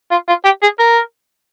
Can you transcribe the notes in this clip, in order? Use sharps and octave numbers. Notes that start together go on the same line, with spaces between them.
F4
F4
G4
G#4
A#4